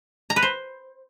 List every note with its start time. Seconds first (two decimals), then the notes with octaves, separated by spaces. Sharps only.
0.30 A#5
0.36 B4
0.43 C5